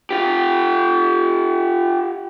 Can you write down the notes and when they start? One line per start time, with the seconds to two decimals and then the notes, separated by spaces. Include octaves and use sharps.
0.11 F4 G4